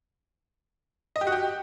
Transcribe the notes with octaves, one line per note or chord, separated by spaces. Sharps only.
D#5
G4
F#4
G4